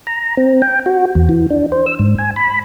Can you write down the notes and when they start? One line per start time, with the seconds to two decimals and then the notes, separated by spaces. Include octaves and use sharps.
0.07 A#5
0.37 C4
0.62 G5
0.86 F#4
1.15 E2
1.29 E3
1.50 D4
1.72 C5
1.86 E6
1.99 G#2
2.19 G#5
2.36 B5